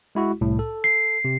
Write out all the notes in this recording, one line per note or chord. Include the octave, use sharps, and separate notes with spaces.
G#3 E4 F#4
C2 A2
A4
C7
C3